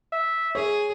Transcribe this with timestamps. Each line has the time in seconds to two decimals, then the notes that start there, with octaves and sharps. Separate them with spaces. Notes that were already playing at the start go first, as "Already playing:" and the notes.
0.12 E5
0.55 G#4 C#5